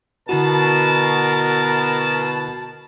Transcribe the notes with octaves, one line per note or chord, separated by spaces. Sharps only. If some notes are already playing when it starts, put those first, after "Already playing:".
B2 D3 E4 F#4 A#4 A5